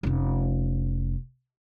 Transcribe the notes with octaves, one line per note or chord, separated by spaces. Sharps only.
F1 C#4